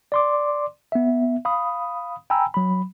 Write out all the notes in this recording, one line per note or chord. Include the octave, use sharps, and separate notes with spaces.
D5 C6 D6
B3 E5
F5 B5 D#6
G5 G#5 A#5 B5 E6
F#3 B5